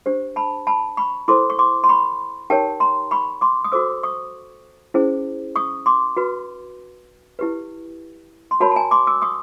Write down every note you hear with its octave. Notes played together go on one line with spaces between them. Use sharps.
D4 G4 C5
A5 B5
A5 B5
B5 C#6
E4 A4 C5 C6 D6
C#6
C6 D6
C6
B5 C#6
D#4 G4 A#4 C#5 G5 A5
A#5 C6
B5 C#6
C6 D6
D#6
F#4 A4 C5 D6 E6
C#6 D#6
C#4 E4 G#4 C5
C#6 D#6
C6 D6
F#4 B4
E4 G4 B4
C6
F#4 A#4 C#5 A5 B5
A5
G#5 A#5
C6 D6
D6 E6
C#6 D#6